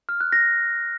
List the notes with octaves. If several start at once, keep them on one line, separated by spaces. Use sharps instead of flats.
F6
F#6
A#6